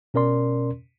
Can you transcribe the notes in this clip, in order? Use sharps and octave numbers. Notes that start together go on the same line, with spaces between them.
B2 C#4 A#4 D5 C6